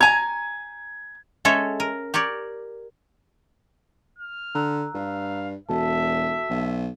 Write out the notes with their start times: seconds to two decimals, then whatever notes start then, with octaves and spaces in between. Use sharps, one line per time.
0.01 G#5 A#5 G#6
1.45 G#3 C#4 A4 C#5 E5
1.80 A#4
2.14 G4 A#4 C#5 D5
4.18 F6
4.55 D3 A#5 E6 F#6
4.95 G2 F5
5.69 E1 F#4 A4 E5 A5
6.50 B1